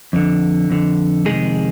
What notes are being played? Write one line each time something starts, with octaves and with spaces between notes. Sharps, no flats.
F2 D3
F2 D3
F2 C3 D#3 G#3 G#4